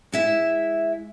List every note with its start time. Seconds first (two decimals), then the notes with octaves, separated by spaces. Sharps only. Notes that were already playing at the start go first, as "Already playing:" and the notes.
0.12 G#3 E4 E5